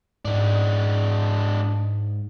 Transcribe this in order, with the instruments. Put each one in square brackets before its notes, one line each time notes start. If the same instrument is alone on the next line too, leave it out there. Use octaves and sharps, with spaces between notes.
[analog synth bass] G#2 [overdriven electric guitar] G#3 D4